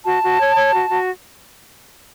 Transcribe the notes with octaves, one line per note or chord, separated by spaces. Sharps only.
F#4 A5
F#4
C#5
C#5
F#4
F#4